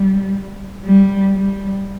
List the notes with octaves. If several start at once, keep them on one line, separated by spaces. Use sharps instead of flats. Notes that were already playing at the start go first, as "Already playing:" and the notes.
Already playing: G3
G3
G3